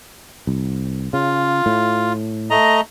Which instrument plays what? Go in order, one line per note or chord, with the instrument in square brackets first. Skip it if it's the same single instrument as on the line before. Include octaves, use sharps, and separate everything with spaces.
[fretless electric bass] C2
[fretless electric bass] C#3 [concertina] F4
[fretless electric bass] A2
[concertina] A3 D#5 A#5